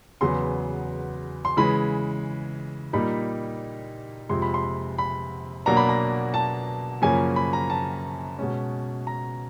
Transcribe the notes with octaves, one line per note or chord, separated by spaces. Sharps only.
E2 C#3 F#3 B3 C6
C6
C#3 E3 G#3 B5
A#2 G3 A#3 D#4 B5
F2 C3 F3 G#3 C6
B5
C6
B5
B2 F#3 A#3 D4 A#5
B5
A#5
A5
F#2 C#3 F3 A#3 C#4 G#5
B5
A#5
A5
B2 G#3 C#4
A#5